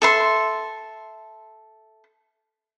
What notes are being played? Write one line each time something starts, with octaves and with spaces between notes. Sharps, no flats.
A4 E5 C6